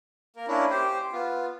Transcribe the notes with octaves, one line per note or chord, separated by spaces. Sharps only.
A#3 A#4
A#3 C#4 D4 E4
G4 C5
B3 F4